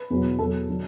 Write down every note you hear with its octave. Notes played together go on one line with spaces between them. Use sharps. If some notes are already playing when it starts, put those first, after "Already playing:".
Already playing: B4 B5
E2 B2 F#3
E2 B2 F#3 A4 A5
D3 F#3